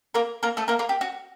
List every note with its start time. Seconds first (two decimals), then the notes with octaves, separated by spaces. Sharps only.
0.14 A#3 A#4
0.43 A#3 A#4
0.57 A3 A4
0.68 A#3 A#4
0.79 A#3 A#4
0.89 G4
1.01 F#4